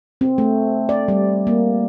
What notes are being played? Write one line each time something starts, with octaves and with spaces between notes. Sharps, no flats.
C4
A3
D5
G3
A#3